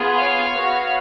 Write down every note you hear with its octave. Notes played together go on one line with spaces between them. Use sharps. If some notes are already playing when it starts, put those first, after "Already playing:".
Already playing: B3 F4 G#4
C#5 F5
B3 F#4